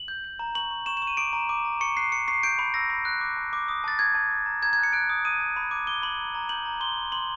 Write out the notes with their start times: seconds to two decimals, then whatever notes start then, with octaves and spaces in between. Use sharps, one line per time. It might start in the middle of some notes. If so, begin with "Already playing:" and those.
Already playing: F#7
0.08 G6
0.24 G6
0.39 A#5
0.55 C#6 F#7
0.71 C#6
0.86 C#6 E7
0.97 E7
1.02 C#6
1.07 D#7
1.17 D6 D7
1.33 A#5
1.49 D6
1.65 A#5
1.81 C#6 C#7
1.97 F#6 C7
2.12 C#6 C#7
2.28 C#6 C7
2.43 G6 D7
2.59 B5
2.74 E6 A#6
2.90 B5
3.05 F#6
3.21 D6
3.37 A5
3.53 D6
3.68 D#6
3.84 A5 A6
3.99 A5 G#6
4.15 A5
4.31 D6
4.46 A#5
4.62 A#5 G#6
4.73 G#6
4.78 F#6
4.83 C#7
4.93 F#6 D7
5.10 D#6
5.25 D#6 D#7
5.40 A5
5.56 B5
5.71 D6
5.87 D6 G7
6.02 B5 F#7
6.18 A#5
6.35 A#5
6.49 G6 F#7
6.65 A#5
6.80 C6 G7
6.97 C6
7.12 C6 F#7